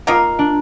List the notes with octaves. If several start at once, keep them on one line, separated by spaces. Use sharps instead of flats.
A#3 D#4 F4 A#4
D4